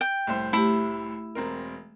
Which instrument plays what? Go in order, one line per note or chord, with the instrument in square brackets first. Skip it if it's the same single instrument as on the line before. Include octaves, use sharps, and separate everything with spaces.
[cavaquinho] G5
[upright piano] C2 A2 C5
[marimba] A3 G4 [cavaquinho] E4
[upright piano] E1 C4 A#4